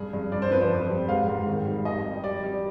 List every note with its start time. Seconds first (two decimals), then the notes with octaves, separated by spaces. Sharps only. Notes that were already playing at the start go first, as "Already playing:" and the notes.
Already playing: G2 G#4
0.13 G2
0.32 G2 D5
0.42 C5
0.51 F3 B4
0.61 C5
0.71 F2
0.90 G3
1.08 G#2 F5
1.28 G#2
1.47 D#3
1.66 G3
1.85 G3 D#5
2.05 G3
2.24 G3 D5
2.43 G3